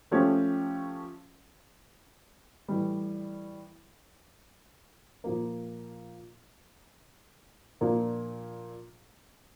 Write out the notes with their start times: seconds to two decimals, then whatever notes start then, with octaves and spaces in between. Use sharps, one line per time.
0.11 F3 A3 C#4 G4
2.68 A2 E3 G3
5.24 A#2 F3 A#3
7.81 A#2 F3 A#3 D4